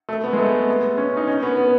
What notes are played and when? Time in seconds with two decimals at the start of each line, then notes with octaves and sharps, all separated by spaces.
0.09 A3
0.24 B3
0.33 G#3
0.38 A3
0.68 B3
0.98 C#4
1.17 D#4
1.27 C#4
1.42 B3
1.57 B3